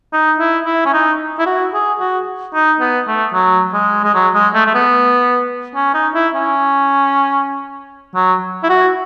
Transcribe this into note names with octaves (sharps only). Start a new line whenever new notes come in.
D#4
E4
E4
C#4
D#4
E4
F#4
G#4
F#4
D#4
B3
A3
F#3
G#3
G#3
F#3
G#3
A3
A3
B3
C#4
D#4
E4
C#4
F#3
E4
F#4